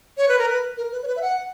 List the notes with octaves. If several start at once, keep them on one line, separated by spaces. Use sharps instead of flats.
C#5
B4
A#4
B4
A#4
B4
C#5
B4
E5
F#5